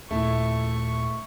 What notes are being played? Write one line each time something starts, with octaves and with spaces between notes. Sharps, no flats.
D#2 A#2 A3 E4 C#6